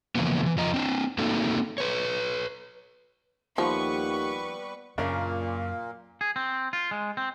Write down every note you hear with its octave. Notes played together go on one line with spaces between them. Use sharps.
C#3 E3 F3 A#3 B3
C3 E3
F2 F3 D#5 A#5
C4 D4
A3 A#3 C4 D#4 F#4 A4
B4 C#5
D#2 F3 G3 B3 B4 F#5 C#6
F#2 A#2 C#3 F#3 A#3 D4 A#4
G#4
C4
F4
G#3
C4